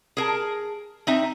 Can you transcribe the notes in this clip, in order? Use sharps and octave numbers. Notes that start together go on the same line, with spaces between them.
G#4 A#4 A5
C4 D#4 E5